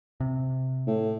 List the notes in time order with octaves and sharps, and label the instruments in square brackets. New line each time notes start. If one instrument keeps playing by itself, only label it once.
[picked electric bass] C3
[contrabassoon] A2